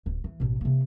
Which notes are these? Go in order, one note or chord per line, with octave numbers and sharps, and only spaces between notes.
D1
E3
A1 B2
C3 A#3